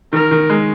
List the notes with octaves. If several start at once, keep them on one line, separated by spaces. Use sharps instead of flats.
D#3 A#4
D#3
G#3